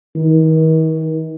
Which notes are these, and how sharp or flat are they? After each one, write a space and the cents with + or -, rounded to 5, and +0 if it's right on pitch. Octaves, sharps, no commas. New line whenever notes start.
D#3 +40